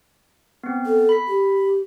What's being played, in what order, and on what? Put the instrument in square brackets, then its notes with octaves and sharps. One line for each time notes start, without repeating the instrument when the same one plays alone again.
[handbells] B3 C4
[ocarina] A4
[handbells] B5 B6
[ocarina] G4